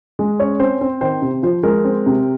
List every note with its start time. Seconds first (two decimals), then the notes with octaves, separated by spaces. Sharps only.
0.19 G#3
0.40 C#4 C#5
0.60 C4 C5
0.81 C4
1.01 D#3 C5
1.22 C3
1.43 F3 C5
1.63 G#3 A#4
1.85 C4
2.06 C3